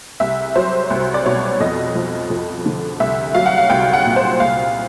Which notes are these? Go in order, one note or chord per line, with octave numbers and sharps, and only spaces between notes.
C2 E5
F#3 C5
C2
D5
B2 C#5
F2 D#5
F3
F2
D3
C2 E5
F#3 F5
F#5
F5
C2 G5
F#5
A#2
C5
C2 F5